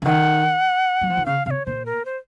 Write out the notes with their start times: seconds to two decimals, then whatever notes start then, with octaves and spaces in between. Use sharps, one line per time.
0.02 C#3
0.05 D#3 F#5
1.01 F#3
1.10 F3
1.17 D#3
1.26 C#3 F5
1.46 C3 F5
1.51 C#5
1.66 A#2 C5
1.86 A#4
2.05 C5